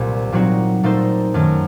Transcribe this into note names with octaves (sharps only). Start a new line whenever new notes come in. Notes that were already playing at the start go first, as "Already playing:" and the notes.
Already playing: C2 A#2 G3
A#2 F#3 C4 D#4 F#4
A#2 A3 D#4 A4 C5
F#2 D#3 A3